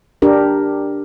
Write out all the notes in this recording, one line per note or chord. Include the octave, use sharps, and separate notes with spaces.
D4 G4 A#4